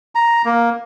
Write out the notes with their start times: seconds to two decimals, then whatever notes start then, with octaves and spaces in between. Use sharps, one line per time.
0.15 A#5
0.45 A#3